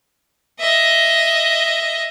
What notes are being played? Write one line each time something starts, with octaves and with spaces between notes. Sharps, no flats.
D#5 E5